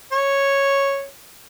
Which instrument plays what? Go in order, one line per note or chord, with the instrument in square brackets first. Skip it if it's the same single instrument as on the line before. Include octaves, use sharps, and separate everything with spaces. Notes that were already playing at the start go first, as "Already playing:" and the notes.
[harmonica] C#5